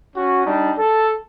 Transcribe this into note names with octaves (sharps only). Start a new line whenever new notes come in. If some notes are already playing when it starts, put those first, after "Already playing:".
C#4 F#4
G3 D4 D#4
A4